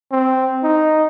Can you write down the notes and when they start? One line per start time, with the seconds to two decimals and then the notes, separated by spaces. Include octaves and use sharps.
0.12 C4
0.63 D#4